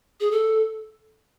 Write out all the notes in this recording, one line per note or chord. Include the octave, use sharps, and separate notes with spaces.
G#4
A4